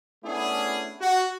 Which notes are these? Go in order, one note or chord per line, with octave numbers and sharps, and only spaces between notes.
A3 B3 C#4 D4 E4 G#4
F#4